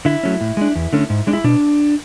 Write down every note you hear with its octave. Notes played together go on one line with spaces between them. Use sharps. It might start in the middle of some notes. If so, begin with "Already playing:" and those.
D3 E4
F#3 A3 C#4
A2
G#3 D4
E2
D3 A3 C#4
G#2
G#3 D4
E4
B2 D4